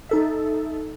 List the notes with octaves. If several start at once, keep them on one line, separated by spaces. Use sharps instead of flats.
D#4 A4 E5